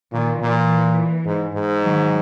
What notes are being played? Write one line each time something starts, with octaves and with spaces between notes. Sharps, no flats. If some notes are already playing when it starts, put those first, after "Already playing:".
A#2 D#3
A#2 E3
G#2
G#2
D#3 F#3